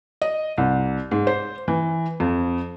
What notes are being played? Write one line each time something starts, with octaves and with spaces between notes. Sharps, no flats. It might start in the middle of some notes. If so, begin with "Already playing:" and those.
D#5
C2
G#2
C5
E3
F2